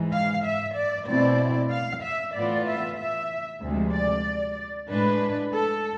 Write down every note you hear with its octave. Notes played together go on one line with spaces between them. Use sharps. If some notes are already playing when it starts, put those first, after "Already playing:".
Already playing: G#2 E3 G#3
F5
E5
D5
B2 A3 C4 E4 D5
F5
E5
A2 E3 B3 F4 D5
E5
E5
D2 C3 F3 G#3
D5
A2 G#3 D4 B4
A4